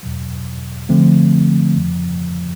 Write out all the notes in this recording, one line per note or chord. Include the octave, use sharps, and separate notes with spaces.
E2 B2 F#3
D3 F3 A3 C4
F2 C#3 F3